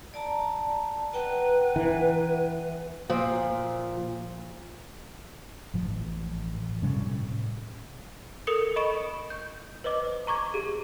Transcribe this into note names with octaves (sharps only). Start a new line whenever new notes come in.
D5 A5 A#5
B4 F#5 G5 A#5
E3
A#2 F3
A1 F3
A2 C3 G3 C#4
A4 A#4 D#6 C#7 G7
D#5 B5 C#6 D7 E7
G6
B4 C5 D#5 D6
A#5 C#6 D6 G#6
G4 G#4